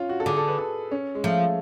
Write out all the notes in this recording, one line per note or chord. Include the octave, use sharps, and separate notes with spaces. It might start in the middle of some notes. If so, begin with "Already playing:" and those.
Already playing: C#4 F4
F#4
A4
D3 G#4
A4
B4
A4
C#4
G#3
F3 A3